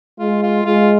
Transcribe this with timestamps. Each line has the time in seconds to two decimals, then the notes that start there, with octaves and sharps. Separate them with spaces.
0.19 G#3 F4
0.43 F4
0.65 G#3 F4